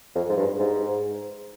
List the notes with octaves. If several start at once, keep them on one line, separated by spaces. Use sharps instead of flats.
F2
G#2
G2
G#2